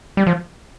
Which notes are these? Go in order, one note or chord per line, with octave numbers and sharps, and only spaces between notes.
G3
F3